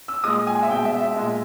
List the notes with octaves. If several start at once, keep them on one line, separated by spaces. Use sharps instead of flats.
E6
A#2 G#3 D#6
G#5
E5
B2 G#3 G5
E5
E5
A#2 G#3